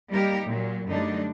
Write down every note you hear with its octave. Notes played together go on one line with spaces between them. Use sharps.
G3 A#3 D#4 G4 A#4
A#2 F#3
F#2 D3 G3 A3 D4 D#4